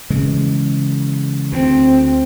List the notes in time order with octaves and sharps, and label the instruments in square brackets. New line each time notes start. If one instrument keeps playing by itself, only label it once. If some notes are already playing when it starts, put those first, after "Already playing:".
[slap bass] C#3 E3 G#3
[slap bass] D2 [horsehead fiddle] C4